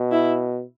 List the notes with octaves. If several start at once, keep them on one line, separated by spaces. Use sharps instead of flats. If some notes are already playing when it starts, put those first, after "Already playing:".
Already playing: B2
E4